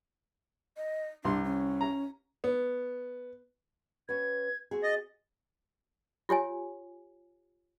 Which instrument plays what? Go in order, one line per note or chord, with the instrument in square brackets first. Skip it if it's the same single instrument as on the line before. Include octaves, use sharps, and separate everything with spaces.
[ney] D#5
[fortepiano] C2 C6 [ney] D4
[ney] C#4
[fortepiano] A#5
B3
[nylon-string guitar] C#4 F#4 B4 [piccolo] G#6
[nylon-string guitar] C4 F#4 G#4
[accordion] D#5 [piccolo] A6
[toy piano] F4 G4 C#5 G#5